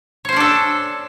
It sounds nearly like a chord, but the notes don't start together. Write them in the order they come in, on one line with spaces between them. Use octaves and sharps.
C#5 C5 C#4 D4 A4